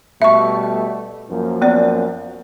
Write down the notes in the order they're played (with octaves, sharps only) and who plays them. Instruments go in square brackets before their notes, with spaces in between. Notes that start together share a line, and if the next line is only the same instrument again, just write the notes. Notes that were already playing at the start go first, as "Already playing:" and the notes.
[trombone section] B2 G3 A3 [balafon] E5 C#6
[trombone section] F#2 F3 A#3
[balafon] B3 D5